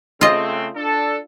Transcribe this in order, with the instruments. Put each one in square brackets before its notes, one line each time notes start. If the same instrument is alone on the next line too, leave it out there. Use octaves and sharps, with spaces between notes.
[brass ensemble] C#3 A3 C4 [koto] F4 D#5
[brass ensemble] D4 A4